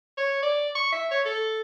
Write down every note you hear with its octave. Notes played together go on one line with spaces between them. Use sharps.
C#5
D5
C#6
E5
C#5
A4